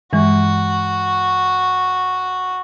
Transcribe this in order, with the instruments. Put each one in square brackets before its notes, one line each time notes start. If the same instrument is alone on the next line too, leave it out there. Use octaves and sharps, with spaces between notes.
[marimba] G2 E3 G#3 [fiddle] F#4